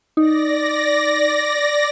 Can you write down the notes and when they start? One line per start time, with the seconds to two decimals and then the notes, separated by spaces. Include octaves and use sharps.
0.17 D#4 D5 A#6